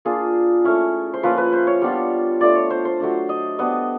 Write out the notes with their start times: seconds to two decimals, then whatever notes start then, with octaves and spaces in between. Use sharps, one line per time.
0.05 A#3 D4 F4 G#4
0.64 A3 C#4 E4
1.14 C5
1.23 F3 A#3 C#4 E4 B4
1.38 B4
1.53 C5
1.67 C#5
1.81 G3 B3 D4 F4
2.41 A3 D4 F4 D5
2.55 C#5
2.70 C5
2.85 C5
3.00 F#3 A3 D4
3.29 D#5
3.59 G3 B3 D4 D#5